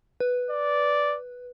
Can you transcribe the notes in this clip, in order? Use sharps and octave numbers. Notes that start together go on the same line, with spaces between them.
B4
D5